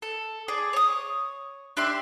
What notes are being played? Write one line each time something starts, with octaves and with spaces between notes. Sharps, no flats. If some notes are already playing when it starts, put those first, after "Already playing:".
A4
G#4 D5
C#5 D#6
D4 G4 E5 C6